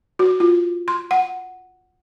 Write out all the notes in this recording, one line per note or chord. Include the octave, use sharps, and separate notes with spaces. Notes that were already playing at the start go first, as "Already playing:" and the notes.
F#4
F4
C6
F#5